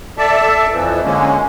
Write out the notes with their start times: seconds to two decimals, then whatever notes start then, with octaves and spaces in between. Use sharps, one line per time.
0.18 A4 D5 E5 A5
0.72 F2 E3 F3
1.04 D3 G#3 A#3 C#4